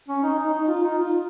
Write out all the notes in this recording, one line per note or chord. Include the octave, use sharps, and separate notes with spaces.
C#4
D#4
D#4
D#4
F4
D#4
F4